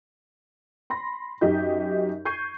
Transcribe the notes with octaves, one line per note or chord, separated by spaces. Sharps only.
B5 C6 A#6
F#2 D#4 G4 D#5 G6
C#6 G6 G#6 C7 D#7